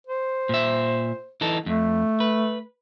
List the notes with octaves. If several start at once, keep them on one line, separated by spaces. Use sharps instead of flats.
C5
A#2 E5
E3 D#4 A4
F2 A3
B4